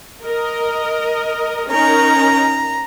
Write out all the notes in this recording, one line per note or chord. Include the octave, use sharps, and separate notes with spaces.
A#4 D#5
C#4 D#4 A#4 A#5